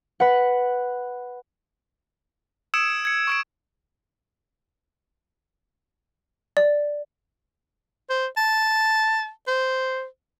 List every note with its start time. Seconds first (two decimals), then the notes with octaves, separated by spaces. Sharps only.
0.20 B4 F#5
2.74 D#6 E6 G#6 C#7 D7 E7
3.05 G#6 C#7
3.27 C#6 E6 D7
6.57 D5
8.10 C5
8.37 A5
9.47 C5